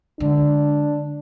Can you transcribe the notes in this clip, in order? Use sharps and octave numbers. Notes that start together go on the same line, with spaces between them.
D3 G#3 D4